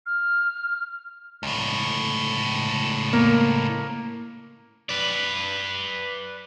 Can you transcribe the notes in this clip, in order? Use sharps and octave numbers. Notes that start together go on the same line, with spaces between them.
F6
C#2 A2
A#3
B4 D5